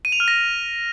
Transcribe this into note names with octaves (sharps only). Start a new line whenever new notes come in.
D#7
F7
F6
A#6